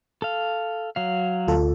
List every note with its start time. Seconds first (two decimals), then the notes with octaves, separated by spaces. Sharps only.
0.22 A4 F5
0.96 F#3 F5
1.48 D2 F4 A4